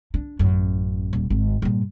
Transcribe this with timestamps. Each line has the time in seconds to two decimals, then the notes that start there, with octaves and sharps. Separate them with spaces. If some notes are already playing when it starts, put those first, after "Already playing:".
0.14 D4
0.39 A1 F#2
1.13 D#1
1.30 G#1
1.62 G2 A#2